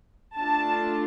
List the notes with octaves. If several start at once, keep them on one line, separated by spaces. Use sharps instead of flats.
A3 D4 F4 A5